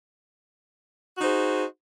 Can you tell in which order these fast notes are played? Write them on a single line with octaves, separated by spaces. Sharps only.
F#4 D#4 C5 G#4